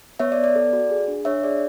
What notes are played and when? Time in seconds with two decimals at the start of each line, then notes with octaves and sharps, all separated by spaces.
0.19 B3 C#5 E5
0.32 D5
0.38 B3
0.44 D5
0.56 A4
0.73 F#4
0.90 G#4
1.08 D4
1.25 D4 C#5 E5
1.43 G#4 D5